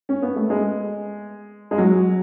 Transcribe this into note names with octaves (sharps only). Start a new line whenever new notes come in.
C#4
B3
A3
G#3
G#3
F#3